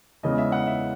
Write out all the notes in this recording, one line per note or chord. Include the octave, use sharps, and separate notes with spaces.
E2 C#3 E3 G#3 D#5
E5
F#5
E5